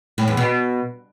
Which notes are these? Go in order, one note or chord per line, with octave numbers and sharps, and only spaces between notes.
A2
E2
B2